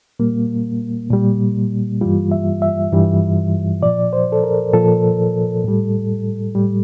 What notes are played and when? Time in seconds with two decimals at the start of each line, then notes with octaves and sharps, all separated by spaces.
0.19 A#2 G3 A#3
1.10 A#2 G3
2.01 G2 E3 G3 F4
2.32 E5
2.62 E5
2.92 G2 E3 G3
3.83 A#2 F3 D5
4.13 C5
4.32 A4
4.44 A#4
4.73 A#2 F3 A4
5.64 A2 G3
6.55 A2 G3